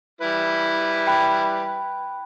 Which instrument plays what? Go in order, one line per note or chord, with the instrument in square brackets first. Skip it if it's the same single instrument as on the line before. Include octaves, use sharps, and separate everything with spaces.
[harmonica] G3 E4 B4
[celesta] G5 B5 F#6